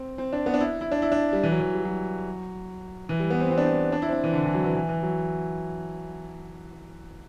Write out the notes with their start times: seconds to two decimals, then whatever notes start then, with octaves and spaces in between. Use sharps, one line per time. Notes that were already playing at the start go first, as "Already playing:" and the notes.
Already playing: C4
0.18 C4
0.33 D4
0.46 B3
0.54 D4
0.60 E4
0.81 E4
0.92 D4
1.02 E4
1.12 D4
1.33 G3
1.43 E3
1.52 F#3
1.60 E3
1.74 G3
1.85 F#3
3.09 E3
3.20 G3
3.30 B3
3.40 C4
3.51 C4
3.58 D4
3.65 C4
3.92 D4
4.02 E4
4.09 C4
4.13 D4
4.24 E3
4.33 D3
4.44 E3
4.54 F#3
4.65 E3
4.75 E3
4.89 E3
5.03 F#3